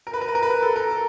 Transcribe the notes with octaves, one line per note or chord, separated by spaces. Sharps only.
A#4
B4
A#4
B4
A#4
B4
A#4
A4
A#4
A4